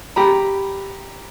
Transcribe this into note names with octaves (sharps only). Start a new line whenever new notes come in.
G4 A#5 B5